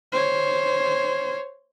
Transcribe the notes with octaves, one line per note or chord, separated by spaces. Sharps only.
C5 C#5